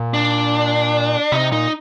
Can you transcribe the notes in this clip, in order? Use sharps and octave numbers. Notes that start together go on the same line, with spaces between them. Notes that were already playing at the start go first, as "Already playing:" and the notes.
Already playing: A#2
D4
C3 D#4
A#2 D#4